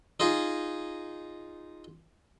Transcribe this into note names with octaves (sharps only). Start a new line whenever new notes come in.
D#4 F4 G#4